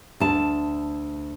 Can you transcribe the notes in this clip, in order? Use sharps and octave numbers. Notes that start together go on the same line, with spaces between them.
D2 A5